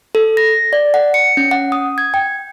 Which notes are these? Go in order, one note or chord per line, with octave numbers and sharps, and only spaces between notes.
A4
A#6
D5
F#5
C#7
C#4
F#5
D#6
G#6
G5